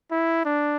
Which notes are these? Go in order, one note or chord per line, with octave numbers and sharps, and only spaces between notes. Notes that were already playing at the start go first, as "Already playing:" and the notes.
E4
D4